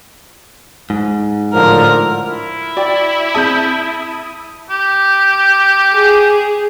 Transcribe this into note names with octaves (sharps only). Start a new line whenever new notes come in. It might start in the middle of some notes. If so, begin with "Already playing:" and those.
G#2
A2 D3 F3 A#4
E4
F#4 D5 G5
C4 G#4 E5 A5 D#6 G6
G4
G#4